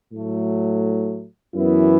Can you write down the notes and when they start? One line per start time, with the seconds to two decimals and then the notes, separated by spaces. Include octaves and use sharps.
0.12 A2 F#3 A3
1.55 F#2 E3 B3 E4